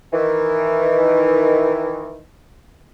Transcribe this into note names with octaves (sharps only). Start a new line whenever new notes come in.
D#3 E3